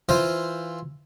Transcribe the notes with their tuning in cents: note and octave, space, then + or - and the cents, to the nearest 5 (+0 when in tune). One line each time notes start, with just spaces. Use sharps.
E3 +0 F4 +0 C5 +0